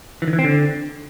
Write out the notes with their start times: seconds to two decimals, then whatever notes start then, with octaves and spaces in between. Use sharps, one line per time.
0.22 E3
0.28 D#3
0.33 E3
0.39 C4
0.44 D3